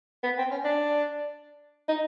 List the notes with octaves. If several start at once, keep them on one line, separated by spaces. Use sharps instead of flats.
B3
C4
C#4
D4
D#4